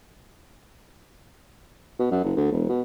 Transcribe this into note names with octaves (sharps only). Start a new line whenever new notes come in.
B2
F#2
F#1
D2
E1
B2